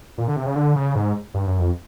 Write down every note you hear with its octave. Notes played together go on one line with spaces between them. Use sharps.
A#2
D3
C3
C#3
D3
C#3
G#2
G2
F#2
F2